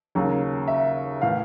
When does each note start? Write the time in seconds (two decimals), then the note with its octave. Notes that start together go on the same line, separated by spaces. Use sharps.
0.15 D#2 C#3 F#3
0.68 E5
1.21 A2 E3 F5